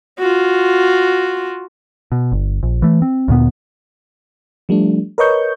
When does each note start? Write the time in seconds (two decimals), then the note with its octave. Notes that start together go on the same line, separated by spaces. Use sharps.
0.19 F4 F#4
2.12 B2
2.32 G1
2.63 A#1
2.82 E3 A3
3.02 C4
3.28 D2 A#2 B3
4.69 F3 G3 A3 D4
5.18 A#4 B4 C#5 D#5 C#6 G6